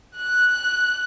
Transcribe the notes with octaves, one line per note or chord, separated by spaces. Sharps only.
F#6